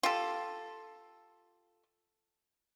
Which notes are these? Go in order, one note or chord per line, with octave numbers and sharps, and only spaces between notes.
F4 G4 A4